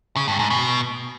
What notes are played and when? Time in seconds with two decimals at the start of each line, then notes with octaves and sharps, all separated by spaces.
0.16 C#3
0.28 G2
0.39 G#2
0.50 B2